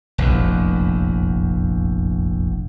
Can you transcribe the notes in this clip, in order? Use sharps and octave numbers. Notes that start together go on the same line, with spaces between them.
F1 A#1 E2